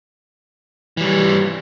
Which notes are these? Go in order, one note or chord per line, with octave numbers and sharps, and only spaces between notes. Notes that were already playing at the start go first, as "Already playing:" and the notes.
E3 G3